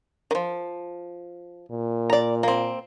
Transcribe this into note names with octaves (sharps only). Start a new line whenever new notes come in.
D#3 F3
A#2
D5 A#5
A#3 C4